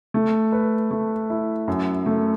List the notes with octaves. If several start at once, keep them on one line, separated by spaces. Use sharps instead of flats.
A3
B4
A3
E4
F#2
A3